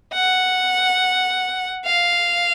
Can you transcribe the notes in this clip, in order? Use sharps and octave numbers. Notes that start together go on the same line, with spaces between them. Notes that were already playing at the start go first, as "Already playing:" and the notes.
F#5
F5